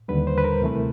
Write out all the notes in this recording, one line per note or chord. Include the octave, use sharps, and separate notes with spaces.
D#2 D3 G3 B4
C5
B4
A#4
D2 C3 E3 A3